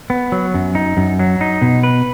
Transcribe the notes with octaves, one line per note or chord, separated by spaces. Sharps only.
B3
F#3
F#2
D#4
F#2
F#3
D#4
B2
B4